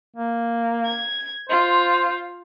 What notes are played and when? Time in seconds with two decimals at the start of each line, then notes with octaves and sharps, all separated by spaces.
0.16 A#3
0.85 G#6
1.49 F4 C5